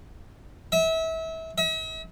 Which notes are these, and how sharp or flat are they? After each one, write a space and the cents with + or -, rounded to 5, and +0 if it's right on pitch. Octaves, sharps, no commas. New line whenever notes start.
E5 -30
E5 -45